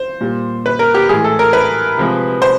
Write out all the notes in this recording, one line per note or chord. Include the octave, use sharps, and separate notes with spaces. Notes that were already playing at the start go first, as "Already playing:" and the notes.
Already playing: C5
A#2 G3
B4
A#4
G4
A2 E3 G#3 G#4
A4
A#4
B4
C3 F3 G#3
C5